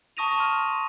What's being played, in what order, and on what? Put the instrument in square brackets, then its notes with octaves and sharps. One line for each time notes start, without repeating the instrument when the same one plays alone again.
[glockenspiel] A5 C#6 D#6 A#6 D#7 F7
C6 F6 D#7